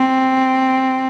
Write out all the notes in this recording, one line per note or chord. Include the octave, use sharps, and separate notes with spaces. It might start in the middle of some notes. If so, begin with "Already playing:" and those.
Already playing: C4